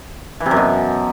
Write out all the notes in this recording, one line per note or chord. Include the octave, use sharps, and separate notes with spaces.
E3
C3
F#2
B2